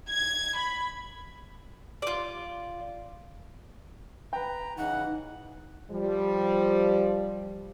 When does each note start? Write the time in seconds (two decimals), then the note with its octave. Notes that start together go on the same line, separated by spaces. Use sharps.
0.10 G#6
0.58 B5
2.02 F4 D5
4.33 B4 G5 A#5
4.78 C#3 E3 D#4 F#5
5.90 F3 G3